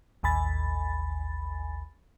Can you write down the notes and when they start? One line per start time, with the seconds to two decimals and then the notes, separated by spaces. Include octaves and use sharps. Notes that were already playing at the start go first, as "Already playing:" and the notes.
0.23 A1 D#2 G#5 B5 A6